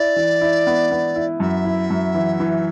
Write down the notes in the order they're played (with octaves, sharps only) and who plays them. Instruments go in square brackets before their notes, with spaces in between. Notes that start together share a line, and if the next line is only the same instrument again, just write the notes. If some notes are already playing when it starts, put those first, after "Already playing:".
Already playing: [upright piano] E4 [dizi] D5
[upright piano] E3
E4
B3
B3
E4
[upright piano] F#2 [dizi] E5
[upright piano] E4
F#2
E3
E3